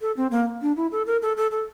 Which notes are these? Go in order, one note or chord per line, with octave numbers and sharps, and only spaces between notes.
A4
C4
A#3
D4
E4
A4
A#4
A4
A4
A4